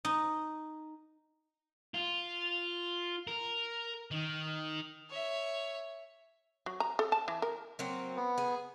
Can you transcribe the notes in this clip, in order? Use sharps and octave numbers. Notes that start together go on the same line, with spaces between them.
D#4
F4
A#4
D#3
C#5 E5
F#3
A#5
A4
A5
E3
A#4
F#3 A#3 C4
B3
G#4